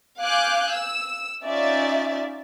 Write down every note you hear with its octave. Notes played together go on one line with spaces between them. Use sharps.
F5 G#5 D6 F#6 G6
E6
C#4 D#4 F4 D5 E5 A6